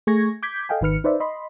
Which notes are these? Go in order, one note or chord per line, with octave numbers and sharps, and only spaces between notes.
A3 G#4 C#6 G#6 A#6
D6 G6 G#6 B6
A4 D#5 F5 G5 G#5
G#1 D#3 B4 F6 C#7
D#4 B4 C5 D5 E5
D#5 B5 C6